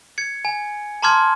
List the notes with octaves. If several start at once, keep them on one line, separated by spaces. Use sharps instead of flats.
G#6 C#7
G#5
A5 A#5 C6 D6 F6 G#6